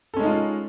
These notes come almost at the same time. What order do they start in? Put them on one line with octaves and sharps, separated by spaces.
A4 C#4 G#3 D#4 F4